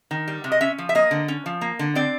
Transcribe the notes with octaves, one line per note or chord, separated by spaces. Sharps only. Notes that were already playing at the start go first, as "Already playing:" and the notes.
D#3
G3
C3
D#5
C#4 E5
F3
E5
A#3 D#5
D3
C#4
F3
A#3
D3
C4 D5